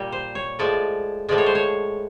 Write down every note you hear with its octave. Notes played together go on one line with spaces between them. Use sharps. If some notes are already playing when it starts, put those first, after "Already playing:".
Already playing: A#2 G3
C5
C#5
A2 F3 G#3 D5
A2 F3 G#3 D5
C#5
C5
C#5